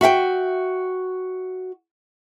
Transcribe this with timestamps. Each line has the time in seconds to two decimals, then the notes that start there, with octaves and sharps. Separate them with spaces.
0.01 F#4 E5 F5 G5